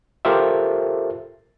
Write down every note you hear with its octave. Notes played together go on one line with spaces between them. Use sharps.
F4 G4 A4 A#4 C5 E5